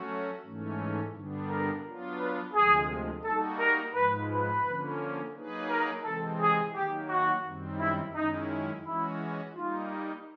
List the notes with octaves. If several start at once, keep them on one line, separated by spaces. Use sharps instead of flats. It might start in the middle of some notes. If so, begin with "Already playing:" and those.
Already playing: F#3 A3 C#4 F#4
G#2 E3 A3 C#4
G2 D3 G3 B3 D4
A#4
F#3 B3 D4 F4
B4
D2 C3 F3 G#3 G#4
G3 A#3 D#4 F#4 A4
A#4
G#2 F3 G#3 B4
B4
D3 F3 A#3 C#4
F#3 A#3 D#4 G#4 B4
A#4
C3 E3 G#3 C4 A4
G#4
D#3 F#3 A#3 G4
F#4
F#2 D#3 G3 C4
E4
F#2 D#3 G#3 C#4 D#4 E4
E3 G#3 C#4 E4 F#4
G3 A#3 D#4 F4